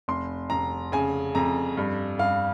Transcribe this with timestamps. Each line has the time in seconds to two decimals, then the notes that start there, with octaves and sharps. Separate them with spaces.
0.08 F1 C6
0.50 F1 A#5
0.92 C#3 G#5
1.35 F2 A#5
1.77 G2
2.19 G2 F5